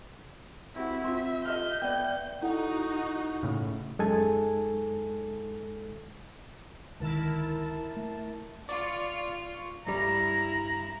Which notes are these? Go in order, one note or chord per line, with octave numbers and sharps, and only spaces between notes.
C4 E4 F#4
C4 F4 E5 C6
D#5 E5 F6 G6
B3 D5 E5 G5
D#4 E4 F#4 A4 F#5
A2 C#3
F#2 G#3 D#4 A4 G#5 A5
C#2 D3 D#3 E4 A#4 A5
A3
F4 D5 C#6
G2 G3 E4 A#5